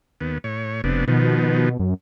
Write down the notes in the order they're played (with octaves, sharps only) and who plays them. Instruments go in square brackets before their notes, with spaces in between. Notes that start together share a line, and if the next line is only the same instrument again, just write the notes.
[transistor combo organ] D#2 B3
A2 C#5
[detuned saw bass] F1 [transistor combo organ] C3 B3 D4
[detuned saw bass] B2 [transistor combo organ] D#3 F3 B3
[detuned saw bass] F#2